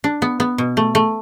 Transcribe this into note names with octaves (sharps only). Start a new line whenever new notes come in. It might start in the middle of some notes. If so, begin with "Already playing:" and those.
D4
B3
B3
B2
A3
A3